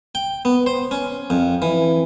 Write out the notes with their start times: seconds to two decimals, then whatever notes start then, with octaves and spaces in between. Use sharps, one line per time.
0.15 G5
0.45 B3
0.67 C5
0.91 C#4
1.30 F2
1.62 E3